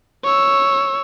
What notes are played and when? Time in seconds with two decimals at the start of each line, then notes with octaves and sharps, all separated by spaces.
0.25 C#5 E6